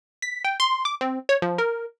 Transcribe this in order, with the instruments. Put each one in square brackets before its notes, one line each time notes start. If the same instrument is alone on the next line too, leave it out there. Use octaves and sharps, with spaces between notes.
[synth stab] B6
G5
C6
D6
C4
C#5
F3
A#4